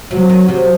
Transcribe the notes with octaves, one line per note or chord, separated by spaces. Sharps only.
C3 F#3
D#3
C3